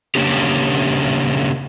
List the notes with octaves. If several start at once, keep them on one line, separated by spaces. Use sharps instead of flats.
C#3 E3 A#3 C#4 D4 G4